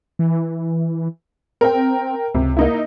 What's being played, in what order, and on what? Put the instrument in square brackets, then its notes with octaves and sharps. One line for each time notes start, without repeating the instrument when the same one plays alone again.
[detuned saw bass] E3
[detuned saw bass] C4 [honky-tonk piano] A#4 G5
[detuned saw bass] C#2 [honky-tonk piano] C3
[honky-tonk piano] A#3 D#4 E4